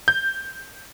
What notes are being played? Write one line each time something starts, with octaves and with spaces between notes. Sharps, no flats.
G6